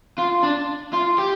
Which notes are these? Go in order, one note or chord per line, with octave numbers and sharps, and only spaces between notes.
F4
D4
F4
G4